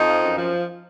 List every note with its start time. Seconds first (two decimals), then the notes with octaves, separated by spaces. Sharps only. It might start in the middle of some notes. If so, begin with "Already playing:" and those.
Already playing: F2 D#4
0.09 F3
0.23 F#2
0.38 F3